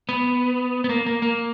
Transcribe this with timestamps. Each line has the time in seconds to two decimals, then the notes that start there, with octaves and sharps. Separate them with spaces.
0.09 B3
0.84 B3
0.89 A#3
1.06 A#3
1.22 A#3